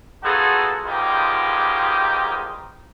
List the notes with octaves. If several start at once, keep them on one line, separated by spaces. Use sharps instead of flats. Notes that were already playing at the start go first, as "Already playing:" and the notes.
B3 D#4 F4 F#4 G#4 A4
A#1 B2 G#3 D#4 F4 G4